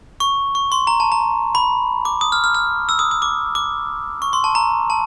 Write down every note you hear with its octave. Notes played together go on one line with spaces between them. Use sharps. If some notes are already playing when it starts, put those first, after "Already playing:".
C#6
C#6
C6
A#5
A5
A#5
B5
D6
D#6
F6
F6
F6
E6
D#6
D#6
D6
D6
C#6
C6
A5
A#5
A5